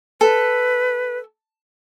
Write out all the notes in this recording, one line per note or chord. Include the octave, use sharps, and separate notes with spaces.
A4 B4